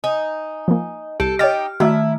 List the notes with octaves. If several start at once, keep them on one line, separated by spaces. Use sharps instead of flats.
D#4 G#5
F3 A#3
C2 G4 A4
D#4 G4 C#5 F6 A6
D#3 A3 E4 F#4 D5 E5